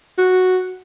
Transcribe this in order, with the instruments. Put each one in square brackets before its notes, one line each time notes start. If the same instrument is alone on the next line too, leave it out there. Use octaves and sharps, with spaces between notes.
[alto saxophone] F#4